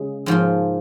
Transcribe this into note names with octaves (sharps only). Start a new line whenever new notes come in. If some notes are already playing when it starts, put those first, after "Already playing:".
Already playing: C#3 G#3
G#2 F3 A#3 F4